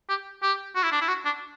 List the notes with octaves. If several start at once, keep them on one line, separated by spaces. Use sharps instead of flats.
G4
G4
F#4
E4
D4
E4
F#4
D4